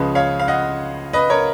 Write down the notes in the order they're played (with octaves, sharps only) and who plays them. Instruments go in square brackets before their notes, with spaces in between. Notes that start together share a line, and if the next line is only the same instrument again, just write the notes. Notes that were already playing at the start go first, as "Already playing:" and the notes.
Already playing: [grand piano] C#2 C#3 F3 B4 D#5
C#5 F5
F5
D#5 F#5
B4 D#5
A#4 C#5